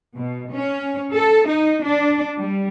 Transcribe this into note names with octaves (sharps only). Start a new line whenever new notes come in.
B2
C#4
A4
D#4
D4
G3